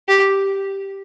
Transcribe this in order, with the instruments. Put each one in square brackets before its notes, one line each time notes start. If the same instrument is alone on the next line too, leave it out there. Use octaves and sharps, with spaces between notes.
[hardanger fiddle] G4